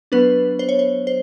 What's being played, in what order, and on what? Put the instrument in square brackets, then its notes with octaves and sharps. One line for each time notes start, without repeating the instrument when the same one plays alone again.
[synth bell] F#3 B3 D4 B4
C5
C#5
C5
C5